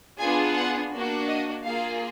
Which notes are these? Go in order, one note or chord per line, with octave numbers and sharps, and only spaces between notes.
B3 D4 F4 G#4 G#5
F#5
A#3 D4 F#4
D#5
A#3 F4 G#4 F5